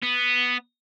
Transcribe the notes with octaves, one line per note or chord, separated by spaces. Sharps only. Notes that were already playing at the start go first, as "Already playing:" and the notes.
B3